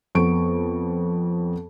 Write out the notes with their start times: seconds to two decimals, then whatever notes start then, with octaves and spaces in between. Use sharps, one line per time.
0.15 F2 B3 C#6 D7